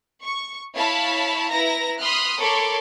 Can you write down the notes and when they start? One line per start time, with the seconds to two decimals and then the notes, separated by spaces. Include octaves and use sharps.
0.23 C#6
0.76 E4 C#5 F5 A5 B5
1.51 E4 B4 A#5 A#6
2.00 B5 C6 D#6 F6 F#6
2.41 A4 A#4 C#5 B5 C6 D6